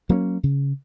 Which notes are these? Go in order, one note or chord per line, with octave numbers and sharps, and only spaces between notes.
F#3 A#3 C4 C#4
C#3